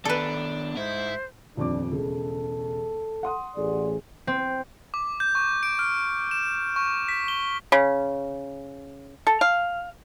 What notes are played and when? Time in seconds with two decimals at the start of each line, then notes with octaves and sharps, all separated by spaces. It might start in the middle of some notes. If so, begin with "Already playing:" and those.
0.05 D#3 B3 D4 A4 B4 A#5
0.77 G#2 E4 C5
1.57 D#1 F2 D4 D6
1.92 E1 C#3 A4
3.23 F#5 C6 D#6
3.56 A1 G#4 D5
4.27 C4
4.94 D6
5.20 G6
5.35 C#6
5.63 D7
5.79 F6
6.31 E7
6.76 C#6
7.08 B6
7.28 G7
7.72 C#3
9.27 A4
9.41 F5